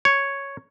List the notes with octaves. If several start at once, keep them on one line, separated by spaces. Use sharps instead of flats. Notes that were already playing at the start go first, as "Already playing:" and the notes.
C#5